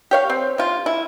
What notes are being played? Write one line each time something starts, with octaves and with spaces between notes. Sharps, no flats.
G4 C#5 F5
C4
C3 F4
E4